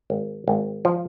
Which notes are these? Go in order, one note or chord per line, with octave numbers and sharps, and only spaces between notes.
G#1
G#1
F3